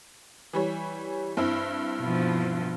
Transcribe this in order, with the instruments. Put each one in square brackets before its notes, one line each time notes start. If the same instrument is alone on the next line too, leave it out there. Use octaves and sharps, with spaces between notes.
[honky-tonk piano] E3 G3 C#5
G2 C4 E4
[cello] B2 F3